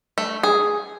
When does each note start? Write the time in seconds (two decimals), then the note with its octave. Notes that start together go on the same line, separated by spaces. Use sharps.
0.18 A3
0.43 G#4